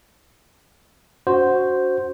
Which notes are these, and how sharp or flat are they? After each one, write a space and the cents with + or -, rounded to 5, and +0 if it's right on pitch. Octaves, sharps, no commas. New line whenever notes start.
D4 -45 F#4 +0 C5 +0